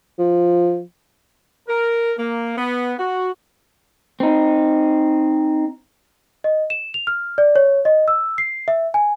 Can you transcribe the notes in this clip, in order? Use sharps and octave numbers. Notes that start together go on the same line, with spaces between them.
F3
A#4
A#3
B3
F#4
C4 D#4
D#5
E7
F7
F6
D5
C#5
D#5
E6
C7
E5
G#5